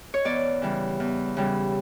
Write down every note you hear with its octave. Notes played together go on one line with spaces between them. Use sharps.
C#5
E2 D5
C#3 E3 G3
E2
C#3 E3 G3